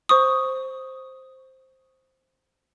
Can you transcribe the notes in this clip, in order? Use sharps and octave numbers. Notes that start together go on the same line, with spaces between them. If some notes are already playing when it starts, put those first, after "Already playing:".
C5 C#6 D#6